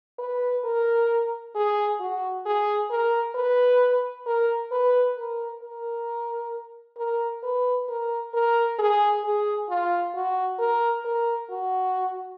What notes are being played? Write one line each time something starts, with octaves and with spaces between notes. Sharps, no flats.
B4
A#4
G#4
F#4
G#4
A#4
B4
A#4
B4
A#4
A#4
A#4
B4
A#4
A#4
G#4
G#4
F4
F#4
A#4
A#4
F#4